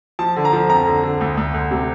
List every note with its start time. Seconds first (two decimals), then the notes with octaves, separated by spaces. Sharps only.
0.19 F3 A5
0.36 D3
0.45 A#5
0.53 F3
0.70 F2 A#5
0.86 D3
1.04 D3
1.21 D2
1.37 D2
1.54 D2
1.71 C3